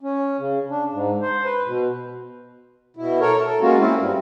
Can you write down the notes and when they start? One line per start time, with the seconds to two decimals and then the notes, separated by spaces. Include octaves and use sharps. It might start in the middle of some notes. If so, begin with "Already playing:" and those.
0.01 C#4
0.39 C#3
0.70 D4
0.92 G#2
1.22 C5
1.45 B4
1.66 B2
2.97 B2 E4
3.20 A4 A#4 C#5
3.44 A4
3.61 G#3 A#3 C#4 F4 F#4
3.77 A#3 C4 C#4 E4
3.98 G2 G3